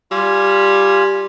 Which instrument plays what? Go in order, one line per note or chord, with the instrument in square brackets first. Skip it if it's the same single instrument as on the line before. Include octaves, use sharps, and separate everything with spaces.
[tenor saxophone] G3 [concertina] F4 G#5